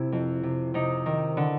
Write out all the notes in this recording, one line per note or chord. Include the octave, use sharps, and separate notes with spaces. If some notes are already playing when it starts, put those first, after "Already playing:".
Already playing: C3 E4
F2
C3
C3 D#4
D#3
D3